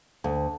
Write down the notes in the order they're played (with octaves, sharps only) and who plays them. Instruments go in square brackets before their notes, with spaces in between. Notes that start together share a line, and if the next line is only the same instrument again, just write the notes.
[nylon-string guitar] D2